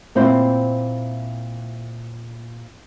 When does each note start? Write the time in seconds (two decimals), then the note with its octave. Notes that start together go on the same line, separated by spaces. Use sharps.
0.15 A#2 C4 E4 C5